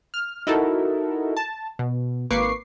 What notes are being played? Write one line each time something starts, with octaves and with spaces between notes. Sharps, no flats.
F6
D#4 E4 F#4 A4 A#4
A5
B2
G#1 A#3 B4 C#6 D6 C7